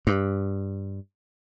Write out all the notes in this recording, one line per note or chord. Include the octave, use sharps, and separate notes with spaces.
G2